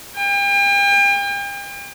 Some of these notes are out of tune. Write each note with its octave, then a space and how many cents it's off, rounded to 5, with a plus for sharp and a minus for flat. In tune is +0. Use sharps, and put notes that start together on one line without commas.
G5 +40